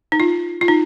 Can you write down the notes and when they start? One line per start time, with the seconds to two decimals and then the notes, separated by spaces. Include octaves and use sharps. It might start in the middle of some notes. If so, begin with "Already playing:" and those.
0.12 D#4
0.20 F4
0.61 F4
0.68 D#4